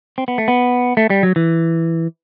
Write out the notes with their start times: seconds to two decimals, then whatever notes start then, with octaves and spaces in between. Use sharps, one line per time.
0.18 C4
0.28 B3
0.38 A3
0.48 B3
0.97 A3
1.10 G3
1.23 F#3
1.36 E3